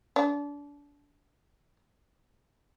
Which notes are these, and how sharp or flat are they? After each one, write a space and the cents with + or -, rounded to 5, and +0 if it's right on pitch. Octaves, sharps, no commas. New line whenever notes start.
D4 -30